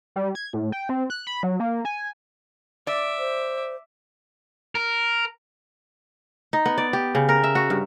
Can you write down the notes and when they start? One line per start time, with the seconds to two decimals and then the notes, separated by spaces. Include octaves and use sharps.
0.16 G3
0.35 G#6
0.53 A2
0.72 G5
0.89 C4
1.10 F#6
1.27 B5
1.43 F#3
1.60 A#3
1.85 G#5
2.87 D5 E5 D6
3.19 C5
4.75 A#4
6.53 D#4
6.66 B3
6.78 D5
6.93 G4
7.15 C#3
7.29 A#4
7.44 E5
7.55 F#4
7.70 G2